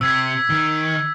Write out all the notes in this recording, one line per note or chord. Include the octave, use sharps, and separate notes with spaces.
C3 E6 G#6 B6
D#3